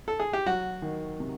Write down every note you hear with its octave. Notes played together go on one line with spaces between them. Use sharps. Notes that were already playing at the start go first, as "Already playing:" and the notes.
A4
G#4
G4
F#3 F#4
D#3
C3